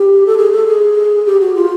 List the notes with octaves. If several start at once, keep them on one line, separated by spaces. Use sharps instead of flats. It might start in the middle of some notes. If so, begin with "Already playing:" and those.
Already playing: G4
A4
G#4
A4
G#4
G4
F#4
F4